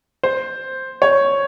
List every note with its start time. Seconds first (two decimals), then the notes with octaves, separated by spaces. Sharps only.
0.23 C5
1.02 C#5